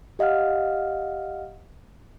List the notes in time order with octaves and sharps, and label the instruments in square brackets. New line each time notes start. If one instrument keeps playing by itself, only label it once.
[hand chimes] G4 D#5 F5 F#5 F6